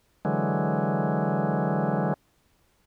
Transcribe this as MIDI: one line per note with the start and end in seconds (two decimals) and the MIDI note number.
0.25 2.14 50
0.25 2.14 52
0.25 2.14 54
0.25 2.14 56